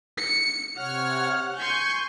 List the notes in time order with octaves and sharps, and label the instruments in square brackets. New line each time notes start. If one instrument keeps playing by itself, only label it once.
[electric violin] C#7
[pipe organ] C3 C#5 F6 [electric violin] F#5
[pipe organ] G#5 C#6 [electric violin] C6 G6